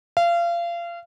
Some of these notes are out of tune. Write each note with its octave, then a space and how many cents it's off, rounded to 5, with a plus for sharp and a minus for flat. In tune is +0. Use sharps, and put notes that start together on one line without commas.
F5 -30